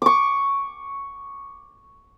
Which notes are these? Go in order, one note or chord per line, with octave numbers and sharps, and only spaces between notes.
C#6 D6